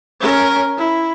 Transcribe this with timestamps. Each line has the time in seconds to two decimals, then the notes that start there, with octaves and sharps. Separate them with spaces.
0.20 C#4 A#4
0.77 E4